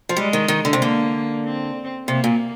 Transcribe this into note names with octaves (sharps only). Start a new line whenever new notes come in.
F3
G3 G#3
D#3
D#3
D3
C3
D3 A#3
C4
C3 A#3
A#2